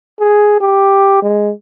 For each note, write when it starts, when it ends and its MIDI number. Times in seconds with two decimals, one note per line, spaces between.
0.20 0.57 68
0.60 1.21 67
1.22 1.52 56